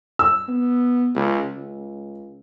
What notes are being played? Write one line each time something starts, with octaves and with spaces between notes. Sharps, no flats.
E6
B3
C#2
C#2